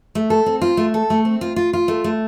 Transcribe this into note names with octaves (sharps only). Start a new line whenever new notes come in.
A3
A4
C4
F4
A3
A4
A3
C4
F4
F4
F4
A3
A3